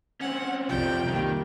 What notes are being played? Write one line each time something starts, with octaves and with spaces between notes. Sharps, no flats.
C4 C#4 F#5
C2 F2 C3 F3 G3 G5
D#3 G3 A#3